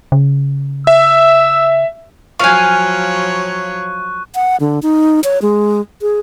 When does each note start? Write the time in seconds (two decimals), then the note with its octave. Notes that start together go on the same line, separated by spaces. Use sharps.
0.12 C#3
0.87 E5 E6
2.40 F3 F#3 C#5 F5 G#5 C#6 F#6
4.35 F#5
4.60 D3
4.82 D#4
5.24 C#5
5.42 G#3
6.02 G#4